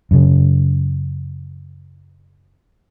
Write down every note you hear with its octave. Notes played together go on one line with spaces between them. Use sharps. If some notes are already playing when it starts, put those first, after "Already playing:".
F#2 C#3